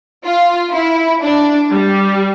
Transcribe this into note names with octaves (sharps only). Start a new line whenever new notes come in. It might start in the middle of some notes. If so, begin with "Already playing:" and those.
F4
E4
D4
G3